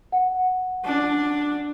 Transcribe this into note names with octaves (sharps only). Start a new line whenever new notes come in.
F#5
D4